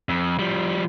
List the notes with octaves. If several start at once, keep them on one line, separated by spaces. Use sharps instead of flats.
F2
F3 G3